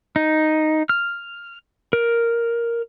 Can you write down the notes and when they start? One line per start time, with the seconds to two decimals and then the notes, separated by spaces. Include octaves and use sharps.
0.16 D#4
0.89 F6
1.93 A#4